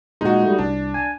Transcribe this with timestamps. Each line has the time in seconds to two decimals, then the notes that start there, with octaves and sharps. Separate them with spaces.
0.21 A#2 G#3 D#4 F#4
0.43 G3 A3
0.58 C2 D4
0.94 G#5